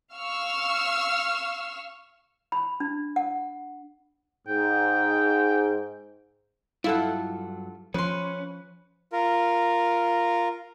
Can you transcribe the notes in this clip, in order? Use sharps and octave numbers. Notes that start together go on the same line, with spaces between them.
F5 C#6 E6 F6
B5
D4
F#5
G#2 G5
G2 F#3 E4 F4 A4 F#5
F3 C#4 B4 C6
F4 A#4